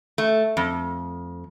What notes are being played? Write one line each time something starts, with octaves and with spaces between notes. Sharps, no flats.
A3
F2